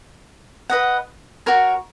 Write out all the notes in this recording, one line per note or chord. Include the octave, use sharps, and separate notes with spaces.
B4 D#5 F#5
F#4 A#4 C#5